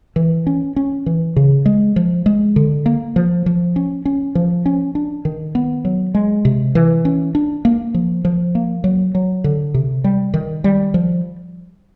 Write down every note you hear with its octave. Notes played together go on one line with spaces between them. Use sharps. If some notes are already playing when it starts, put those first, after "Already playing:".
E3
C#4
C#4
E3
C#3
G#3
F3
G#3
D3
A#3
F3
F3
C#4
C#4
F3
C#4
D4
D#3
B3
F#3
G#3
C3
E3
C#4
D4
A#3
F3
F3
A#3
F#3
F#3
D3
C3
G3
D#3
G3
F3